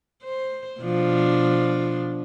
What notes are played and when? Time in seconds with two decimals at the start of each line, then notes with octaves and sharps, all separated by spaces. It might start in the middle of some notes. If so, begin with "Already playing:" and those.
0.23 C5
0.81 B2 F3 D4